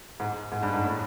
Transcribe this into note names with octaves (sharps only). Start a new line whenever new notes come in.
G#2
G#2
G2
G#2
A2